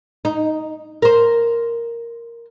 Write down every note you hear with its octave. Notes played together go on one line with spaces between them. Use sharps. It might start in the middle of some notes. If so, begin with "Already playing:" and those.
D#4
A#4 C5